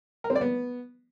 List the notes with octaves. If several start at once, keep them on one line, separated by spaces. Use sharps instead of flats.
A#4
C4
D5
B3